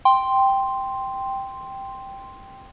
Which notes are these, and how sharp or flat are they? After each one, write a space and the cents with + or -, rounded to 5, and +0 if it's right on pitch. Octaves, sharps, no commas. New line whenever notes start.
G5 +0 C6 +0